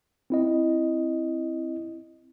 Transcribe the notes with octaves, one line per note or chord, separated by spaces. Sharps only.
C4 E4 D#5